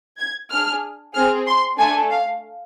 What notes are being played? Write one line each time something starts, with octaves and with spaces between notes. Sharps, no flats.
G#6
D4 G#4 F6
C4 G#4 F6
C6
A3 D4 A4 G#5
F5